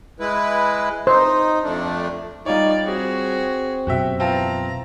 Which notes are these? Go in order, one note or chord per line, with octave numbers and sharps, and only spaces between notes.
G#3 E4 B4
D#4 C5
F2 A3 D4
G3 D#4 F4 C#5 D5
C4 F#4 G#4
F#2 B2 F#4 G4 E5
E3 C4 F4 A5 A#5